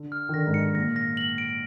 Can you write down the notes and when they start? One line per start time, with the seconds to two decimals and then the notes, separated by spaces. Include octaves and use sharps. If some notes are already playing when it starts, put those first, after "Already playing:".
Already playing: D3
0.12 F6
0.29 D#3
0.34 D3 A#6
0.47 G#2
0.54 C#7
0.75 A#2 A#6
0.96 A#6
1.17 F#7
1.38 D7